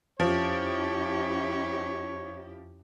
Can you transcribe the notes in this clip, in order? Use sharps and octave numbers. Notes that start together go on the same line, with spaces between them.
F2 F3 C#4 E4 G4 C#5